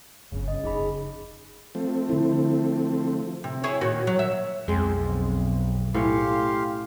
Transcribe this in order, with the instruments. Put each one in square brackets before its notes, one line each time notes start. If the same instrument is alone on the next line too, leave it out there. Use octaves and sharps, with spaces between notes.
[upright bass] G1 F#2 [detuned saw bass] C#3
[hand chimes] D#5
[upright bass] F#1 F2 [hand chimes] D#4 G#4 B5
[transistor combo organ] F3 A3 C4
[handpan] D3 E4
[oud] C3
E4 G#4 C#5
A#2 D#3 F#4
F#3
E5
[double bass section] B1 [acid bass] F2 [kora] G#3 C4
[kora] A2 C#4 C#5 [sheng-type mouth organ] G4 F5 C6